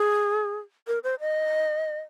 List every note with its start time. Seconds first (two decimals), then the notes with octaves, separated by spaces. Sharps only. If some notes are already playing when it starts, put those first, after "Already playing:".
Already playing: G#4
0.88 A#4
1.04 C5
1.20 D#5